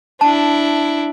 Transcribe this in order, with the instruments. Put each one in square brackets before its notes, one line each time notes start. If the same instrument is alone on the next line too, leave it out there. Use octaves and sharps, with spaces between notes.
[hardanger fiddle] D4 E4 [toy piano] A5